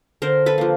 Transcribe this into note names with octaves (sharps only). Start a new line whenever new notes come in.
D3 A#4 C5
A4 B4
F3 A#3